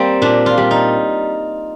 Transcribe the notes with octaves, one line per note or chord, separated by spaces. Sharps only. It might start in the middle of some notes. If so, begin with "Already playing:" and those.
Already playing: G3 A#3 C4
A#2 D4
F4
G3
D#4